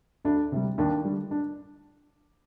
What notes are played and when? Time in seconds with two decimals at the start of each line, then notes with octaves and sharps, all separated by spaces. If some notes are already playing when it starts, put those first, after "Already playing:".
0.25 D2 D4
0.52 C3 G3
0.78 D#2 D4
1.05 D3 G3
1.31 D4